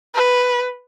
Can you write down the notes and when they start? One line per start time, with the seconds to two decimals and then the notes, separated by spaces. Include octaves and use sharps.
0.15 B4